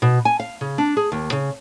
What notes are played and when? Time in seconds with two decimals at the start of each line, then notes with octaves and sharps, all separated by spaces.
0.02 B2
0.25 G#5
0.40 F5
0.61 C#3
0.78 D4
0.97 G#4
1.12 D#2
1.32 C#3